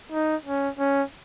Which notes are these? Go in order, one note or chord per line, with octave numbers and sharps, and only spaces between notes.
D#4
C#4
C#4